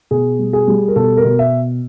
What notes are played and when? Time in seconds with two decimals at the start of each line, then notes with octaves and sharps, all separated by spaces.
0.11 B2 G#4
0.39 G3
0.53 G#4
0.68 G3
0.88 A#4
0.96 B2 A4
1.17 A#4
1.24 B2
1.39 E5